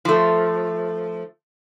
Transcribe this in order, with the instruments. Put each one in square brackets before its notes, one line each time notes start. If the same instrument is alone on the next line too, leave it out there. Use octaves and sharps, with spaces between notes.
[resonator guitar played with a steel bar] F3 A3